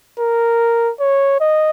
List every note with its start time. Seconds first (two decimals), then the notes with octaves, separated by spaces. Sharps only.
0.19 A#4
1.00 C#5
1.41 D#5